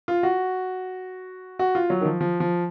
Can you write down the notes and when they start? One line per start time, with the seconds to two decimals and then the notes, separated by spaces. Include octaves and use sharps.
0.08 F4
0.23 F#4
1.59 F#4
1.75 F4
1.90 F#3
2.01 D#3
2.05 F3
2.21 F3
2.40 F3